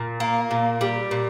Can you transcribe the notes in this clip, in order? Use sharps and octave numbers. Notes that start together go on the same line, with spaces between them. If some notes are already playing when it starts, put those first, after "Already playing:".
Already playing: A#2
A#3
A#2
G3
A#2